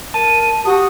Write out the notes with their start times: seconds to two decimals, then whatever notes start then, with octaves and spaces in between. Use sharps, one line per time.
0.14 A#4 A5 D#7
0.65 F#4 G4 D#6